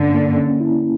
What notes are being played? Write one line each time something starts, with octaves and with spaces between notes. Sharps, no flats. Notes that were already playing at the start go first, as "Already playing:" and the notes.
Already playing: G2 D3 A#3 C#4
A#3
C#4
E4